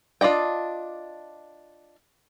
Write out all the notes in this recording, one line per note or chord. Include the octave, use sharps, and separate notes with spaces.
D4 F4 D5 D#5 G5